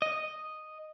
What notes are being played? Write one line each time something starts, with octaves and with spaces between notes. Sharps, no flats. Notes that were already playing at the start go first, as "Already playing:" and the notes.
D#5